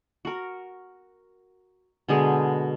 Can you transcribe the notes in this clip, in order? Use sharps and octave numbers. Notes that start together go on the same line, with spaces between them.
F#4 A#4
B2 D3 G#3 G#4